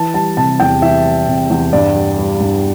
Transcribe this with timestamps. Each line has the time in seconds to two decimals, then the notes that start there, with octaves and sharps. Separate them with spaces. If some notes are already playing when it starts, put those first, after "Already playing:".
Already playing: E3 A5
0.14 G3 A5
0.37 C3 A5
0.60 E2 G5
0.82 E3 E5
1.05 G3
1.28 C3
1.50 E2
1.73 G2 D5
1.96 G3
2.18 G3
2.40 G2